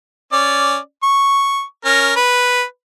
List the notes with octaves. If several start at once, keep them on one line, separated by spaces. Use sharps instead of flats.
C#4 D5
C#6
C#4 A#4
B4